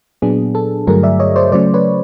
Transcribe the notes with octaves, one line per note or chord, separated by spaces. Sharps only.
A#2 F#3 B3 D4 G#4
A4
G2 D3 F#3 A3 G#4 A#4
D5 E5
C#5 D#5
C5 D5
C#3 F#3 A3 C#4 C5 D5
B4 C#5